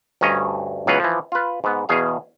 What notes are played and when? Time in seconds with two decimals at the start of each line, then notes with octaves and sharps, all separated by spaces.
0.21 D2 G2 C#4 D#5 A#5
0.87 C#2 E3 F#3 B3 B4 F5
1.00 E3 F3
1.32 F4 B4
1.64 G#2 B3
1.89 E2 B2 G#4 F5